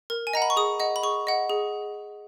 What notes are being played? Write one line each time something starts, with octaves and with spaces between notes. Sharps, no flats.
A#4
G#5
D#5 F#5 A#5
B5
C#6
G#4 D#6
D#5 F#5
B5
G#4 C#6
D#5 F#5
G#4